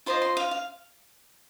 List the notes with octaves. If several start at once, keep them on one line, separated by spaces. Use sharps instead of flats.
F4 C5 D#5 C6
C6
F5
F5